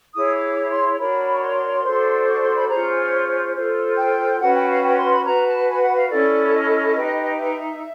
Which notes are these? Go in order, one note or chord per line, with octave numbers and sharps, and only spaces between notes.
E4 G#4 C#5 D#6
D6
D6
C6
D4 F#4 A#4 C#5 B5
C#6
C6
D4 F#4 A4 C5
C#6
C6
B5
C#4 F4 G#4 C5 A#5
G#5
F4 A4 C5
G5
C#4 F#4 B4 F#5
G5
F5
G5
C6
B5
F#4 B4 A#5
A5
G#5
F#5
F5
C#4 E4 A4 D5
D#5
D#4 G4 B4
E5